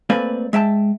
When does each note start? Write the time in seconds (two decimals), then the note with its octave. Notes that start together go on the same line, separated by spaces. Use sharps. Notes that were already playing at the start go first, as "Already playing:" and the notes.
0.10 A3 A#3 C4 B4 D5 G#5
0.53 G#3 E5 G5 A5